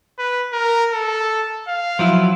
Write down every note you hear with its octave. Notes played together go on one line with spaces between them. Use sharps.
B4
A#4
A4
F5
F3 F#3 E4